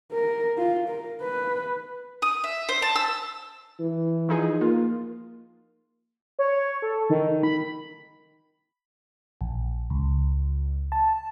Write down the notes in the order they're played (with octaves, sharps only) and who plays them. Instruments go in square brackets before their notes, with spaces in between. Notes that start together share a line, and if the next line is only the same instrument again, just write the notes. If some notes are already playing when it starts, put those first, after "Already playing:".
[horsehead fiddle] A#4
F4
A#4
B4
[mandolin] D#6
E5
C5
A5
E6
[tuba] E3
[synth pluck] F3 D#4 G#4
[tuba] A#3 [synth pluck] F4
[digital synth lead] C#5
A4
D#3
B5
[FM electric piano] A#1
C#2
A5